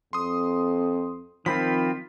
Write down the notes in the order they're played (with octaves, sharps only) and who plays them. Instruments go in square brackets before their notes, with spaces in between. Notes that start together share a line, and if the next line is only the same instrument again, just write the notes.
[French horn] F2 [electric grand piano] C6 D#6
[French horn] D#3 [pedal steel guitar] F3 C4 F4 [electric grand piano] B5 B6